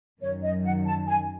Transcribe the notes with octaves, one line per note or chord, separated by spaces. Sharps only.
F#2 D#3 F#3 C#5
D#5
F#5
A5
G#5